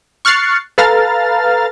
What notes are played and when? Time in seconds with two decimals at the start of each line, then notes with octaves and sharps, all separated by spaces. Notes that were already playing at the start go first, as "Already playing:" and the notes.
0.25 C#6 F6 F#6 A6 C7 C#7
0.78 A4 B4 F5 A#5 F6 A6